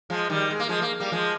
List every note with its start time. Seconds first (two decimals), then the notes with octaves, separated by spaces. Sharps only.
0.10 F3 G#3
0.30 D#3 G3
0.51 G#3
0.60 A#3
0.69 F3 G#3
0.81 A#3
1.00 G3 A#3
1.12 F3 G#3